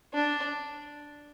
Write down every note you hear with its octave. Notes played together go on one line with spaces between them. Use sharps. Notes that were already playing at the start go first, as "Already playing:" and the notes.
D4